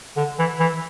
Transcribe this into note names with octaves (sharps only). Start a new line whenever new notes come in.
D3
E3
E3